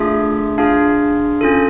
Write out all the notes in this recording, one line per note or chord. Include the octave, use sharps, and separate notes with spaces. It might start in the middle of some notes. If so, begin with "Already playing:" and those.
Already playing: A3 D4 F4 G#4 E5
D4 F4 G#4 F5
C#4 F4 A4